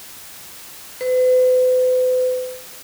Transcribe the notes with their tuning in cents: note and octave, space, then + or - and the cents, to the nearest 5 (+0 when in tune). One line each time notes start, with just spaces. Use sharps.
B4 +45